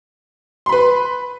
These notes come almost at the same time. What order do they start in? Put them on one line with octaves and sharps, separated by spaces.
C6 B5 B4